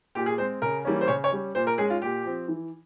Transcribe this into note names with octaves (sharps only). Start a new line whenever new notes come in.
A#2 G4
G#4
G#3 C4 C5
C#3 A#4
E3 G3 A#3 C#4
C5
C#3 C#5
C#5
G3 C#4
A#2 C5
A#4
G#3 C#4 G#4
F4
A#2 G4
F3 C4
E3